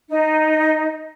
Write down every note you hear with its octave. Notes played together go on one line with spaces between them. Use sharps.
D#4